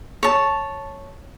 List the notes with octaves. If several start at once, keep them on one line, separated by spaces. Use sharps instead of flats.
C#5 A5